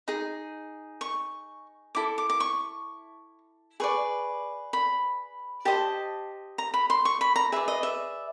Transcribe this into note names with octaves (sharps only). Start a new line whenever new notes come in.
D#4 G#4
C#6
E4 A4 D6
D6
D6
C#6
G#4 B4 D5 C#6
B5
G4 C5 D#5 A5
A#5
B5
C6
C#6
B5
A#5
G#4 B4 D5 E5
D#5
E5